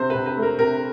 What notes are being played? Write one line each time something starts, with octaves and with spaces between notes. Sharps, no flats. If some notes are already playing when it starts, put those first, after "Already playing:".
Already playing: C3 C5
B4
C3
B4
A3
A#4
C3 A#4